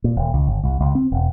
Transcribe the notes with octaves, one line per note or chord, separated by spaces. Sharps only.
A#2
D#1
C#2
G1
C2
C#2
C4
E1